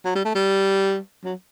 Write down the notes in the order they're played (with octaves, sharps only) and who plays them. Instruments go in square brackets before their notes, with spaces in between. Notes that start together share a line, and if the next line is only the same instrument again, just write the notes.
[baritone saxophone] F#3
G3
A3
G3
F#3